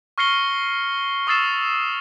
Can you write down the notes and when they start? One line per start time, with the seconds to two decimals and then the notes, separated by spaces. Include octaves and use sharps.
0.18 C#6 F6 A#6 C7 C#7 G7
1.27 C#6 D#6 E6 A6 C7 E7